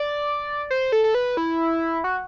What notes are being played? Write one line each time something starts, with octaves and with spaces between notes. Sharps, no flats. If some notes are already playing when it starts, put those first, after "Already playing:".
Already playing: D5
C5
A4
A4
B4
E4
F#4